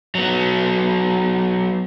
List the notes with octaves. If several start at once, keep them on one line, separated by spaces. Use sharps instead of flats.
F#3 B3